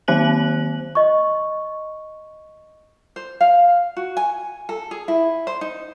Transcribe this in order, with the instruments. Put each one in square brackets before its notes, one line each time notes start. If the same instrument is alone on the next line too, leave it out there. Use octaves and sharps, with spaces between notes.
[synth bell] D#3 F#3 A#3 C5 F#6 F#7
[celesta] D#5 C#6
[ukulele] C5
F5
F#4
G#5
A4
G#4
E4
C5
D#4